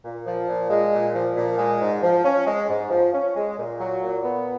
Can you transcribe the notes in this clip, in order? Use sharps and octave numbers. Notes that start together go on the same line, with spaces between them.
A#2
F3
A#2
G#3
A#2
F3
A#2
G#3
G#2
F3
C#4
G#3
G#2
F3
C#4
G#3
A#2
F#3
A#2
B3